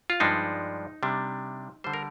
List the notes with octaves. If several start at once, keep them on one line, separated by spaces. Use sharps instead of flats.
F4
G2 F3 G#3 D4 D#4
C3 G3 D4
D3 G3 C5
A#4